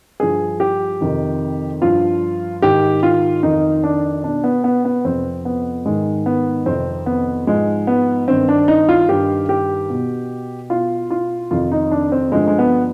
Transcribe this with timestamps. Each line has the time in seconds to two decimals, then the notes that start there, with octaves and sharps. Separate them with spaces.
0.20 G2 D3 F3 G#4
0.60 G4
1.01 F2 C3 D#3
1.81 G2 F3 F4
2.62 G#2 D#3 G4
3.03 F4
3.43 F2 D#3 D#4
3.84 D4
4.24 B2 D4
4.44 B3
4.64 B3
4.85 B3
5.05 F2 C3 F3 C4
5.45 B3
5.85 G#2 D#3 G#3
6.26 B3
6.66 F2 C3 D#3 C4
7.06 B3
7.47 G#2 F3 G#3
7.87 B3
8.28 G2 D#3 C4
8.49 D4
8.68 D#4
8.89 F4
9.09 G2 D#3 G4
9.49 G4
9.90 B2
10.70 B2 F4
11.11 F4
11.51 F2 C3 D#3 F4
11.72 D#4
11.91 D4
12.12 C4
12.32 G2 D3 F3 G#3
12.48 G#3
12.59 B3